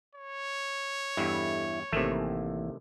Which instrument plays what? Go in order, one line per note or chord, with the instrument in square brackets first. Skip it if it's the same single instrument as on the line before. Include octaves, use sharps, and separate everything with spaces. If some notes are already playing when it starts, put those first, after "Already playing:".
[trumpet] C#5
[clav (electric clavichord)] E2 G2 [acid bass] E4 [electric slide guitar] G4 A4 D#5
[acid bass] A1 [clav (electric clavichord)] C3 D#3 A3 [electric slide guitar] E3 A#3 E4